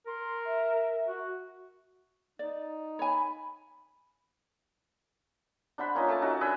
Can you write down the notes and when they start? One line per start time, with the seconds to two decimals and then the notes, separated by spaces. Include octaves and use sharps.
0.07 A#4 C6
0.45 E5
1.08 F#4
2.39 D#4 D5
2.99 C#5 G#5 B5
5.78 D4 C5 F#5 B5
5.95 A#3 C#4 D#4 F4
6.09 A3 A5
6.22 C#4 D#4 F#4 A4
6.41 D4 B4 G#5 E6